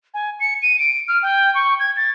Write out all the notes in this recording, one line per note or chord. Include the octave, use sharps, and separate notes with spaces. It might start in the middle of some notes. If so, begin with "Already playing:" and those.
G#5
C#7
D#7
D7
F6
G5
C#6
G#6
A6